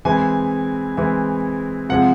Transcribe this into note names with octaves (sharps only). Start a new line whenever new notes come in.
E3 G#3 C4 E4 G#5
E3 G#3 C4 E4
C3 F3 G#3 F#5